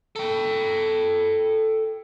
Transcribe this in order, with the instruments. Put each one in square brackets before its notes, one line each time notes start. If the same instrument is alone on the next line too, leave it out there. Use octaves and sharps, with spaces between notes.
[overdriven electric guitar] A4 G5